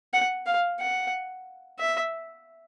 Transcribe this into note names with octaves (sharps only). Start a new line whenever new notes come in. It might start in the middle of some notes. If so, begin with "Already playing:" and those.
F#5
F5
F#5
E5